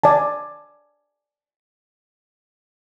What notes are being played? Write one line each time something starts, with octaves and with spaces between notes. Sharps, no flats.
D5 G#5 A5